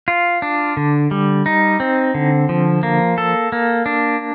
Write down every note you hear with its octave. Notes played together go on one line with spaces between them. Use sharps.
F4
D4
D3
G3
D#4
C4
D3
F3
A#3
A4
A#3
D4